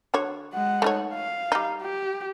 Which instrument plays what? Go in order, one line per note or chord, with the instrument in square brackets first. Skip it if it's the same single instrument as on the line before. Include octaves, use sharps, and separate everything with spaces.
[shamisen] D3 F#4 C#5
[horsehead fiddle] G#3 F#5
[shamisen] A3 D#4 C#5
[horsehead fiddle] F5
[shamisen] G3 D#4
[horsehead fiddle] G4